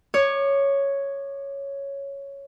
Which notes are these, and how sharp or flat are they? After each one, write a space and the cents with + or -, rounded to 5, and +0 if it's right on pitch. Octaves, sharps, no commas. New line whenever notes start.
C#5 +0 D6 +40